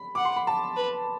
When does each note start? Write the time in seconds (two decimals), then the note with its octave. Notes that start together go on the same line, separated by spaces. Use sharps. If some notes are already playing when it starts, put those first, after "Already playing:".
Already playing: B5
0.15 F#5 D6
0.25 C6
0.36 B5
0.47 A5
0.76 B4